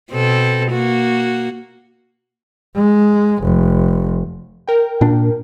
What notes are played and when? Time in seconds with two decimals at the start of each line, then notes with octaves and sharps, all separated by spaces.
0.11 B2 C4 A4
0.71 A#3 F#4
2.75 G#3
3.43 F1
4.68 A#4 G5
5.01 A#2 D4